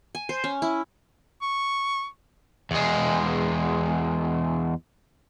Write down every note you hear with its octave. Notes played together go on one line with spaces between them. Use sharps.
G#5
C5
C#4
E4
C#6
E2 G#3